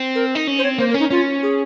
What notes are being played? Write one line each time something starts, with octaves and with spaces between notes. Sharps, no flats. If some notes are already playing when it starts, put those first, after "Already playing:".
Already playing: C4
A#4
D#4
C#4
C5
C4 C#5
A#3 C5
A#4
C#4
D#4
C#4 F4
G#4